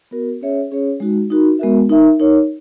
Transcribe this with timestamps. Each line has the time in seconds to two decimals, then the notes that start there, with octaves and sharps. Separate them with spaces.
0.11 B3 F#4 A#4
0.41 C#4 G#4 C#5 E5
0.72 C#4 G#4 C#5
1.00 G#3 D#4 F#4
1.30 D#4 F#4 A#4
1.59 G#3 B3 F#4 A#4 E5
1.89 D#4 A#4 E5
2.19 D#4 A#4 C#5